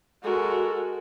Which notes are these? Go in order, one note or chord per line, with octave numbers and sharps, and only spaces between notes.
G#3 F#4 A4 A#4